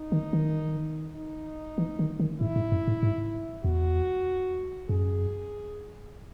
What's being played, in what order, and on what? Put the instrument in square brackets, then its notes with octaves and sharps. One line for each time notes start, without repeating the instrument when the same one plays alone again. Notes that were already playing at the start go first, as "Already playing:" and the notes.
Already playing: [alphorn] D#4
[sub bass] D#3
D#3
[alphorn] D#4
[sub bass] E3
D#3
D#3
[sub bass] G#2 [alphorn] E4
[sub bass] G#2
F#2
G#2
G#2
[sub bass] E2 [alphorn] F#4
[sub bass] F#2 [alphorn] G#4